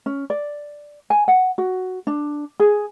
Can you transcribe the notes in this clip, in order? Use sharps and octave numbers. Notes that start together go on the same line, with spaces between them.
C#4
D5
G#5
F#5
F#4
D4
G#4